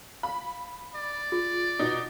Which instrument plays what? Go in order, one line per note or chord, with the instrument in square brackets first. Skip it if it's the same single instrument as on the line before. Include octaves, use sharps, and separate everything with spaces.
[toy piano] F5 [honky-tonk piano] B5
[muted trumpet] D5
[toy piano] F4 G#4
[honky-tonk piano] B2 D#4